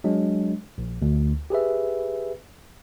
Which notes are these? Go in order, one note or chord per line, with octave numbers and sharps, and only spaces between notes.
F#3 G#3 D4
A#1
D2
G4 G#4 B4 E5